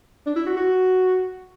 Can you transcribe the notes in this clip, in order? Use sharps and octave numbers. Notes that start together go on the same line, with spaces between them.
D4
E4
F#4
F#4